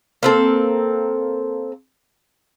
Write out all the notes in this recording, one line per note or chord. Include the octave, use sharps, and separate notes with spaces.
A#3 C4 A4